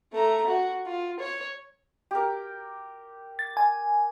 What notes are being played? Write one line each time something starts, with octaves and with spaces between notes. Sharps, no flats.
A3 A#5
F#4
F4
C#5
G4 A#4
A6
G#5